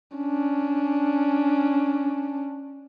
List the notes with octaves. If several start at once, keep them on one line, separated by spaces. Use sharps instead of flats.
C#4 D4